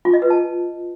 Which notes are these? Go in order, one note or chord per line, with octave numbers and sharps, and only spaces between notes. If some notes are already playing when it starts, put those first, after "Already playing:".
F4
D#5
B4
A5